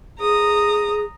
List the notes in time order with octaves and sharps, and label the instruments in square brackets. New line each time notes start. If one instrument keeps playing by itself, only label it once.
[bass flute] G#4 [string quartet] A#5 D#6